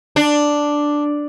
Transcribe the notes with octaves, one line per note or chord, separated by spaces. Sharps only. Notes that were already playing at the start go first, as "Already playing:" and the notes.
D4